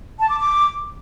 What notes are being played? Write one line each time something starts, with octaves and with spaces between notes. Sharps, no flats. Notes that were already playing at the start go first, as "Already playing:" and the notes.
A5
D6
D6